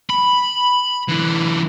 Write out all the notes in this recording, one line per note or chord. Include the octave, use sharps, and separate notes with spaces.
B5
D3 E3